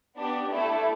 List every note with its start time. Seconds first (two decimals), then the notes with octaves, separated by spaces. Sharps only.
0.17 B3 D4 G4
0.52 A3 E4 A4